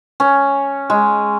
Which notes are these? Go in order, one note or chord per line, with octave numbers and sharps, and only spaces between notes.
C#4
G#3